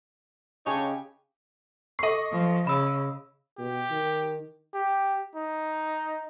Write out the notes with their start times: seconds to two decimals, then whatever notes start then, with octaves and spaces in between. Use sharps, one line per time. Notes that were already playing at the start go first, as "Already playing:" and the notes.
0.66 C#3 D4 D#4 G4 C#5
1.99 A4 D#5 C#6 C7
2.31 F3
2.67 C#3 B5 E6
3.59 B2 G4
3.90 D#3
4.74 G4
5.35 D#4